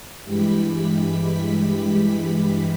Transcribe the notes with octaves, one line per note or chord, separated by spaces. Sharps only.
G2 E3 G#3 G4 B5 B6